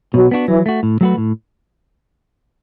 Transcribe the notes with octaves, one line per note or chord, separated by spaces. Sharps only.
B2 F#3
B3 D4 F#4
E3 F#3
A3 F#4
A2
F#3 A3 F#4 B4
A2